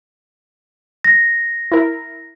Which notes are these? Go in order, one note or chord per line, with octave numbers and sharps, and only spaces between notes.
A#6
E4 A#4